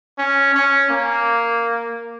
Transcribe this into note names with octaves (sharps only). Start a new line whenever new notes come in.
C#4
C#4
A#3